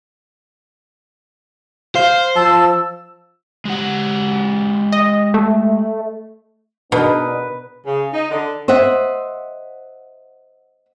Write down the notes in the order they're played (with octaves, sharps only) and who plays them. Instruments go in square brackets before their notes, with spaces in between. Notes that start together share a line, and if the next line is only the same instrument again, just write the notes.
[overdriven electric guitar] C5 [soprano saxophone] F5
[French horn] F3 [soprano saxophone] A5 [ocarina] E6
[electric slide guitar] G#3 G4 F#5
[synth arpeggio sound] D#5
A3
[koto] B2 [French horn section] B3 D4 [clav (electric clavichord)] D#4 A#4 [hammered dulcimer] B4
[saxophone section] C#3
D#4
D3
[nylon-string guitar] C5 D#5 E5 F#5